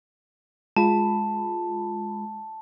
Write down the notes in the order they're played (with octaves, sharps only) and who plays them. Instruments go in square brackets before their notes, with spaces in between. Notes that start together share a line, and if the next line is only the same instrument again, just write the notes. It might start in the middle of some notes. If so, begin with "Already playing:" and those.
[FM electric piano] G#3 F4 B5 [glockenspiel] A5